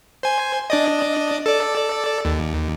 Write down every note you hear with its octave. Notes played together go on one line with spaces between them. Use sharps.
C5 G#5
D4 D5 D#5
A4 D5
D#2